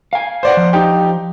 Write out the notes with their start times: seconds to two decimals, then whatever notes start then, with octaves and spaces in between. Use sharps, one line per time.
0.13 F5 G#5
0.43 C5 D5 F#5
0.57 F3
0.73 D#4 G4